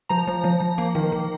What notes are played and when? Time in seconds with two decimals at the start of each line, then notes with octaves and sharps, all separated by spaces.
0.09 F3 A#5
0.27 F3
0.44 F3
0.60 F3
0.78 A#3
0.95 D#3
1.12 D#3